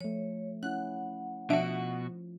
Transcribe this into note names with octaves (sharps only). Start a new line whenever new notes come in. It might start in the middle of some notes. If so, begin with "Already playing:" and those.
F3 A3 C#5
C#4 E4 F#5 F#6
B2 F3 D4 F#4 E5 D7